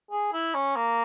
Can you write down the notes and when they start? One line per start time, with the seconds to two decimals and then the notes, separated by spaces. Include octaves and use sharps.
0.11 G#4
0.33 E4
0.54 C#4
0.76 A#3